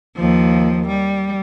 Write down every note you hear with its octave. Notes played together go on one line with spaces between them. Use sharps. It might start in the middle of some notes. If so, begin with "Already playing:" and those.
D#2 F3
G3